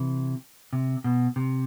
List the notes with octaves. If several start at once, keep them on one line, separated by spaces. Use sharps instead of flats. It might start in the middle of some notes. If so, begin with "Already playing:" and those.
Already playing: C3 E3
C3
B2
C3